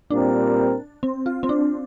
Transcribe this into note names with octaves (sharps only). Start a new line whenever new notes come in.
A#2 G3 C4 D4 A#4
C4
F4
C4
D4